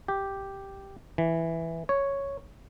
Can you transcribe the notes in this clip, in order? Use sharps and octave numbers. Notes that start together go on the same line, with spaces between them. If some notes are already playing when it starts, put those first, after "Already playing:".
G4
E3
C#5